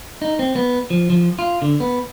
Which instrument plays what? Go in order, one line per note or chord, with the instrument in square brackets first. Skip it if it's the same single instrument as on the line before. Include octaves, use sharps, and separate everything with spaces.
[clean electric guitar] D#4
C4
B3
F3
F3
F4
D3
B3